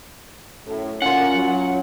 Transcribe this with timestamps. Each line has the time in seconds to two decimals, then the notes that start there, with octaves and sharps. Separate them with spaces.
0.65 F#2 A2
1.02 A#2 D3 C#4 F4 A#4 F#5
1.34 F#3